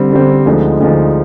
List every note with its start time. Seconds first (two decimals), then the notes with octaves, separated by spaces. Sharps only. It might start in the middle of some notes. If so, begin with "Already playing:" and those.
Already playing: D3 G3 C4
0.12 D3 G3 C4
0.46 D2 D3 F3 G#3 D#4
0.80 D2 D3 F3 G#3 D#4